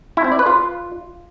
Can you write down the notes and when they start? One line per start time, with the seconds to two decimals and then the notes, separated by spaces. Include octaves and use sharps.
0.17 E4
0.24 C4
0.32 D5
0.39 B4
0.46 F4